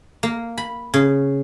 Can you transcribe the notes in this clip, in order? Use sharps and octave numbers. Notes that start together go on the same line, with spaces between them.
A#3
B5
C#3